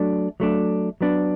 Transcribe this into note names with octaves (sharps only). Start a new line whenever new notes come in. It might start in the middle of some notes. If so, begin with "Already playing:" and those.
Already playing: F#3 A3 D4
F#3 A3 D4
F#3 B3 D4